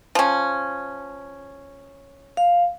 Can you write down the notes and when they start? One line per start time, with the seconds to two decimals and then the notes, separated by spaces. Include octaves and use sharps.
0.15 F3 C#4
2.37 F5